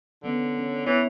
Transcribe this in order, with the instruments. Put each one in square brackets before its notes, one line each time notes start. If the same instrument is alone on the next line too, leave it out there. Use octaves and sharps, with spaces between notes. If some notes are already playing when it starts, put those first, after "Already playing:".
[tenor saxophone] D3 [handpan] E3 B3 C#4
[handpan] C#4
[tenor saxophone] E3 [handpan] B3 E4 C#5